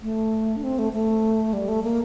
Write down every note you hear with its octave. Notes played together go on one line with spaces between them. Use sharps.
A3
D4
C4
A3
A3
G3
A3
A#3